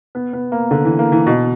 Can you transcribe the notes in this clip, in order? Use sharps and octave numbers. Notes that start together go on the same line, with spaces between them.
B3
B3
A#3
D3
E3
A#3
E3
B2